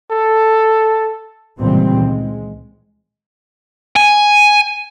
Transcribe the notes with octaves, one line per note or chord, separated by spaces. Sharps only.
A4
C#2 A#2 D#3 E3 G3 C4
G#3
G#5